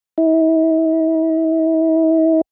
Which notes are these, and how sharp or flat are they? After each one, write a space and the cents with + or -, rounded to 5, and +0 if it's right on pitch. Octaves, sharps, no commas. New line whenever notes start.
E4 -40